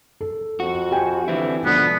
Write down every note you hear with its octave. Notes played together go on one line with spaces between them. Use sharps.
A4
F2 F#4
G4 G5 G#5
D3 E3 C4 E4
G#2 B2 D3 F3 B3